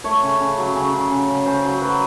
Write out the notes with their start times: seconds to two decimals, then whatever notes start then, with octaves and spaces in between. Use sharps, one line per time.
0.04 A3 C#5
0.23 C#3
0.40 C#3
0.58 F#3
0.76 C#3
0.94 C#3
1.11 C#3
1.29 C#3
1.46 C#3 C5
1.65 F#3
1.82 F#3 B4